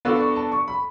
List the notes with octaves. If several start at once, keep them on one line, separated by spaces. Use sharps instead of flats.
B3 D4 F#4 A4 F5
C#6
A5
C#6
B5